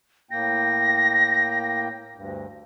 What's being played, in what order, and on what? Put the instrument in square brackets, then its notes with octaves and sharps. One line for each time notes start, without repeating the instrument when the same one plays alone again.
[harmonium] A2 A#3 G5 [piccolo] A#6
[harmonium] D2 G2